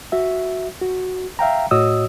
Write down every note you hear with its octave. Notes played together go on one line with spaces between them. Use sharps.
F#4 E5
F#4
E5 F5 G5 A#5
A2 F#4 C#5 D#5 D#6 E6